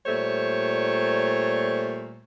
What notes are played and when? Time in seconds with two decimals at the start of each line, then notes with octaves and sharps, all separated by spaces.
0.06 A#2 G3 A3 C5 C#5